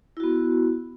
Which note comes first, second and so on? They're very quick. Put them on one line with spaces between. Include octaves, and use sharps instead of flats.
E4 F#4 B3